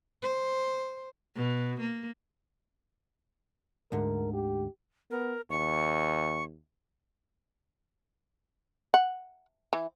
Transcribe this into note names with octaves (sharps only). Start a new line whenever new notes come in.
C5
B2
A#3
D2 G#2 D3 A#4
G4
B3 A#4
D#2 C#6
F#5
E3